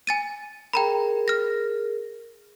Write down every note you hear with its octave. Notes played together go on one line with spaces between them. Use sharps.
G#5 A6 D#7
G#4 A#4 G5 A#5 B5
F6 A#6